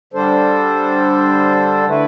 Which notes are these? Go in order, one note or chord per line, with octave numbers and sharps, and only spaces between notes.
D3 G3 D4 A4 C5
D3 A3 E4 B4